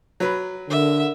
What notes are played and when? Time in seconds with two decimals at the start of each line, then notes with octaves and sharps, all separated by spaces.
0.20 F#3 B4
0.69 D3 A#4 E5